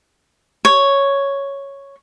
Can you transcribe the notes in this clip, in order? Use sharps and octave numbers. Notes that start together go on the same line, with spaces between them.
C#5